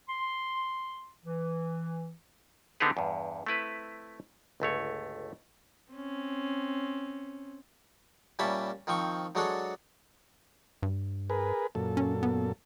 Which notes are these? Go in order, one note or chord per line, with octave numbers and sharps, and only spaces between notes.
C6
E3
D3 B3 C4 D#4 G4 G#4
E2 G2
A3 C4 E4 B4
G1 C#2 A3 C#5
C4 C#4
A#2 G3 C#4 E5 A5 B5
D#3 F3 C4 C#6
F#3 G#3 D4 F#4 A4 F#5
G2
G#4 A#4 B4
F#2 A#2 A4
C#4
B3